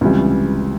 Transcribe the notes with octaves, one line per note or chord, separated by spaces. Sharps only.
C#2 C3 E3 G3